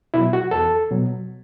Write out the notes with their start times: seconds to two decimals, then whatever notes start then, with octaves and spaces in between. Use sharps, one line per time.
0.14 B2 F#3 E4
0.33 F#4
0.51 E2 A4
0.91 B2 F#3